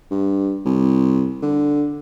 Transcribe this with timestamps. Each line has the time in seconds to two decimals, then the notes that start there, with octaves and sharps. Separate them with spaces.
0.11 G2
0.65 C2
1.42 D3